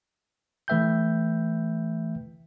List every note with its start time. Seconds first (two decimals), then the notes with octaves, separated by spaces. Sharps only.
0.68 E3 A3 B4 E5 G5 G6